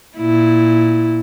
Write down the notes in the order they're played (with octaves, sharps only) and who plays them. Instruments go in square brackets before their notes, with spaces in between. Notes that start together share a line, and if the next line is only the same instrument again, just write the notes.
[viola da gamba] A#2 E4